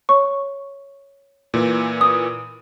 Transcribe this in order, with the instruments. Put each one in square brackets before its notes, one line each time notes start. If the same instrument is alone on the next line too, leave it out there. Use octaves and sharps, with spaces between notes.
[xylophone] C#5 C#6
[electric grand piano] A#2 E3
[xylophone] D#6